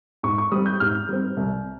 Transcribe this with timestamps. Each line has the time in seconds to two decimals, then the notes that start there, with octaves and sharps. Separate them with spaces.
0.23 G#2 C#6
0.38 C#6
0.52 G3 C4 D#6
0.66 G6
0.80 G#2 F6
1.09 G3 C4
1.37 C2